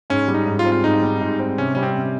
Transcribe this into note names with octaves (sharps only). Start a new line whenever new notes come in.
G#2 C#4
G3
D#4
G#2
F4
C4
F4
G#2 D#4
G3
G#2
C4
C3 C#4
G3 C#4
C4
C3